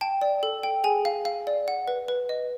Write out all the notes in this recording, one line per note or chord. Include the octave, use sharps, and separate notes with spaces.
G5 A5
D5
A4
G5
G#4 G#5
F5
F5
D5
F#5
B4
B4
D#5